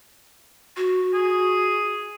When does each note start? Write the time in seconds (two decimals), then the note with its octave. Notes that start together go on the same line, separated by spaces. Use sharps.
0.77 F#4
1.13 G#4